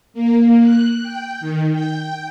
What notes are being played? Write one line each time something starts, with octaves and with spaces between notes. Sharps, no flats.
A#3
F#6
G5
D#3
G5